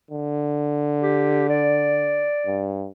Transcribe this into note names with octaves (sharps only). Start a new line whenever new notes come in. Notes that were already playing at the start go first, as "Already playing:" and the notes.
D3
G4
D5
G2